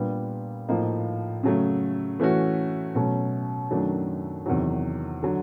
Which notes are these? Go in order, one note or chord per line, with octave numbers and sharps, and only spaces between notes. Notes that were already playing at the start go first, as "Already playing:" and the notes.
Already playing: A#2 G3 B3 D4
A2 F3 A#3 D#4
C#3 F#3 A3
E3 A3 C#4 F#4
B2 F#3 A3 C#4
F#2 D#3 F#3 A3 D4
E2 C3 D#3 F#3
D3 F#3